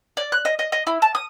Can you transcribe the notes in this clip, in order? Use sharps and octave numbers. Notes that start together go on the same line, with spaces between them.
D5
F#6
D#5
D#5
D#5
E4
A5
D#6